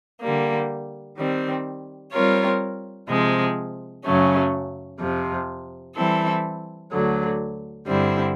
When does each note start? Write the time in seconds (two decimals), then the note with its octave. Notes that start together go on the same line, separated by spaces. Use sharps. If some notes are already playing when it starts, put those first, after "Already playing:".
0.21 D3 G3 A#3
1.16 D#3 G3 C4
2.12 G3 C4 F4 A#4 C#5
3.08 C3 F3 G#3
4.04 F#2 C#3 F#3 A3 C#4
4.99 F2 C3 F3
5.95 E3 G3 C4 E4 A4
6.91 D2 D3 F#3
7.87 G2 D3 G3 C4 E4